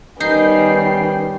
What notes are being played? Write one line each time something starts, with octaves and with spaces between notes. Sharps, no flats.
D#3 G3 B3 C#4 D#4 G5 G6 C7